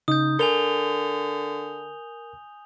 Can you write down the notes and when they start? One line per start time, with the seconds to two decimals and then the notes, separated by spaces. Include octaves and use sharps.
0.08 C#3 D#4 D#6 G6
0.39 D3 A#4 G#5 F7 G7